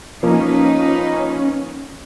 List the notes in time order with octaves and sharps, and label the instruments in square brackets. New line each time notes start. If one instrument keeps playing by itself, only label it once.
[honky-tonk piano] F3 A#3 [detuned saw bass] C#4 [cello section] D#4 B4